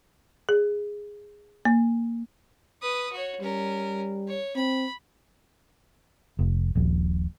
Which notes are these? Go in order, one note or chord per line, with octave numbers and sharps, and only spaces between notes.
G#4
A#3
B4 D#6
F#4 C#5
G3 C#4 A#4
C#5
C4 B5
F1
D#1 A#1